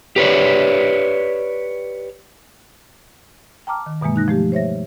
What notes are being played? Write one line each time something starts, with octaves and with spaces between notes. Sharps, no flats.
G4 B4 C#5 D5
G5 A5 A#5 D6 F6
D#3
G2 B2 E3 G#3 A#3
D#4 F#6 A#6
F3 A3 G4
C5 C#5 E5 A#6